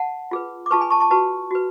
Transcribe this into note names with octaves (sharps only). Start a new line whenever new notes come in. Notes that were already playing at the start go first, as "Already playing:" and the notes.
Already playing: F#5 A5
F4 G#4 B4
D6
F4 G#4 B4 A5 C#6
G#5 B5
A5 C#6
A5 C#6
F#4 B4 A5 C#6
F#4 B4